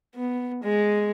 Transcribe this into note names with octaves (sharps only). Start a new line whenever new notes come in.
B3
G#3